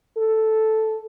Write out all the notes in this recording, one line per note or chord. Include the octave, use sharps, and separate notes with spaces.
A4